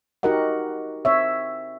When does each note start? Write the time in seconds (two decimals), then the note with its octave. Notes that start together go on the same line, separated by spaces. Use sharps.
0.23 D#4 F#4 G4 A#4 D#5 F#5
1.05 C4 C#5 E5